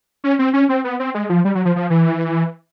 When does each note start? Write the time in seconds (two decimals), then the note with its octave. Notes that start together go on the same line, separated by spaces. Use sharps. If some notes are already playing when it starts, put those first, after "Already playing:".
0.24 C#4
0.39 C4
0.53 C#4
0.69 C4
0.84 B3
1.00 C4
1.15 G#3
1.30 F3
1.45 G3
1.55 F#3
1.65 F3
1.76 F3
1.90 E3